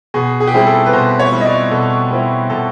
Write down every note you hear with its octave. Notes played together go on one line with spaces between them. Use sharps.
B2 G#4
G#4
G4
G3 C4 E4 G#4
A4
B4
B2 C5
C#5
G3 C4 E4
D#5
D5
B2 A4
G3 C4 E4
B2 A4